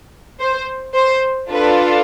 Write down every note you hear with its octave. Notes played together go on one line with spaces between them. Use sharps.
C5
C5
D4 F4 A4 B4